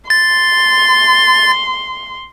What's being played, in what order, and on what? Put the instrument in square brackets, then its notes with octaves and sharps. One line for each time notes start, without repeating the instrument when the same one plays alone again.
[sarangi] C6 [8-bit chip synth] A6